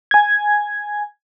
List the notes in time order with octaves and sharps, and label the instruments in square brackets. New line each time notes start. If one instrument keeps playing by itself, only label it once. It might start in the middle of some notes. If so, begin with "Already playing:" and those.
[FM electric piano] G#5 G#6